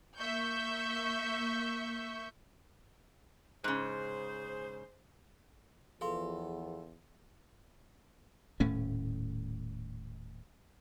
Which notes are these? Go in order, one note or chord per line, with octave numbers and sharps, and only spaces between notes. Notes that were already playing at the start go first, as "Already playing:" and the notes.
A#3 E5 C#6 G6
G#2 C#3 G#4 C5
E2 F3 B3 G#4 A4 F5 C6
D#1 A2 A3 C#4